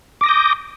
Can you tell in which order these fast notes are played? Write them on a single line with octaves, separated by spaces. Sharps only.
D6 A#6 D#6 G6